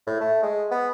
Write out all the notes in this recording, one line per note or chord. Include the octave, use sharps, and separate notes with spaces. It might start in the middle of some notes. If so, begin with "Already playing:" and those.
A2
A3
G#3
B3